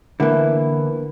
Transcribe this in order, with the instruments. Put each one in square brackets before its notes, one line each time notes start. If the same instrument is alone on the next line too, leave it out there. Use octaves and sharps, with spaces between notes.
[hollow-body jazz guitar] D3 E3 [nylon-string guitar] A#3 B3 E4